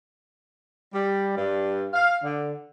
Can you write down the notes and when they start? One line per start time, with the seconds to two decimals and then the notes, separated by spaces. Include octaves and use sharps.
0.94 G3
1.37 G2
1.94 F5
2.24 D3